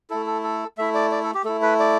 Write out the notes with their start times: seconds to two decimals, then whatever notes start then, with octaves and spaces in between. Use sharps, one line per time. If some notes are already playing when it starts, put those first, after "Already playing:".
0.10 A3 E4 A4
0.26 A4
0.43 A4
0.78 A3 E4 E5
0.94 D5
1.11 D5
1.23 A4
1.34 G4
1.45 A3 E4 A4
1.62 B4
1.80 D5